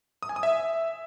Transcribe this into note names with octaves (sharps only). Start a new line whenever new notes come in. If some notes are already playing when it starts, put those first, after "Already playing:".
D#6
G#5
D#6
E5